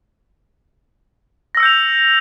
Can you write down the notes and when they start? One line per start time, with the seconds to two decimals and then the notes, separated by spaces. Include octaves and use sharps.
1.55 A#6
1.57 E6
1.60 C#7
1.63 G6
1.65 F7